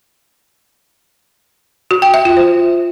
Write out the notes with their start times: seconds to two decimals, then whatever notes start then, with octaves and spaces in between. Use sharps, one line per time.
1.91 F#4
2.02 G5
2.14 E5
2.25 F4
2.37 C5